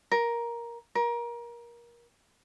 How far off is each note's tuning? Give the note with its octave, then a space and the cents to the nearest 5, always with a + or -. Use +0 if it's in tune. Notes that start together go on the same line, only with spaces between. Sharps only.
A#4 +10
A#4 +25